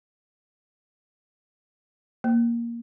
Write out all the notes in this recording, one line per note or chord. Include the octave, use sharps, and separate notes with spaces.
A#3